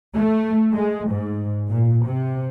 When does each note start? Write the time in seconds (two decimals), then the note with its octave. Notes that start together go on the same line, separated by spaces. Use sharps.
0.15 A3
0.72 G#3
1.08 G#2
1.71 A#2
2.06 C3